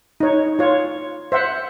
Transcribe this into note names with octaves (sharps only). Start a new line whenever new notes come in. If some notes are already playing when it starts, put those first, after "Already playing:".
D#4 C#5
F4 C#5
C5 E5 F#5